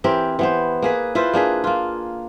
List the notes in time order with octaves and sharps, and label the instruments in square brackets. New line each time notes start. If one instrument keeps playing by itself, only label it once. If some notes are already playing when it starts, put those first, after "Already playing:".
[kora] E3 C4 G4 A#4
E3 B3 C5
A#3 G#4 B4
E4 F4 B4 C5
A#3 D4 G#4 B4
A#3 F4